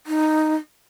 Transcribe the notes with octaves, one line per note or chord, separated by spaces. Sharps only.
D#4